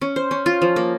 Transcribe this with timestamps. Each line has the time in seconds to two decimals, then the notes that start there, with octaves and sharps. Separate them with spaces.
0.02 C#4
0.16 C5
0.31 C#4
0.46 F4
0.62 F3
0.76 A#3